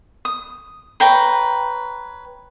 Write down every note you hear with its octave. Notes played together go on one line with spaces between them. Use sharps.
D#6
B4 C#5 G5 A#5